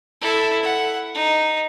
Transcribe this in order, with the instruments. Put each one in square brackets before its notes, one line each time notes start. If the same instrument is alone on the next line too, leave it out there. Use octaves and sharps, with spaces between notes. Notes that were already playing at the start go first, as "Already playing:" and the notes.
[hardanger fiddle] E4 A4
F#5
D#4